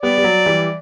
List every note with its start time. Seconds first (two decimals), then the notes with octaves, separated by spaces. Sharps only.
0.02 G3 B3 D5
0.18 G3
0.24 F#3
0.46 E3 G3